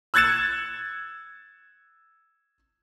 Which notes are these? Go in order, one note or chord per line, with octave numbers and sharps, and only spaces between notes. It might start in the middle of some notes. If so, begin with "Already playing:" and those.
E6 F#6 G#6 A6 C#7 E7